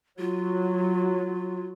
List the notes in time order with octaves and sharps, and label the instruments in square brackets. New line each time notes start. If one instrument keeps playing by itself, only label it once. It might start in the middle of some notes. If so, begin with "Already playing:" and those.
[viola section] F#3 [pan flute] F4